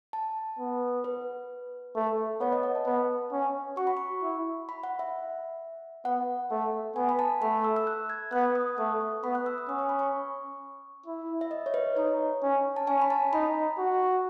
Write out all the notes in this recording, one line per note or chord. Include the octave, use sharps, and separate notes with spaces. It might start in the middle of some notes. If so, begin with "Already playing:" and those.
A5
B3
B4
A3
B3 C#5
D#5
F#5
A5
B3
C#4
F#4 C#6
B5
C#6
E4
B5
F#5
E5
B3 F#5
A3
B3 G#5
B5
A5
A3 B5
E6
E6
F#6
G#6
B3 F#6
D#6
A3 D#6
C#6
B3 B5
F#6
E6
D#6
C#4 D#6
C#6
B5
C#6
E4
E5
D#5
C#5
B4
D#4 C#5
C#4
A5
C#4 G#5
B5
A5
D#4 B5
F#4